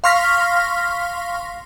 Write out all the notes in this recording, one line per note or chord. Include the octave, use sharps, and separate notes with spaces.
F5 C6 C#6 F6 A#6 B6